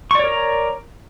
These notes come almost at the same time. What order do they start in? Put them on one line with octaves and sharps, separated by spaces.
C#6 D5 C#5 A#4 A#5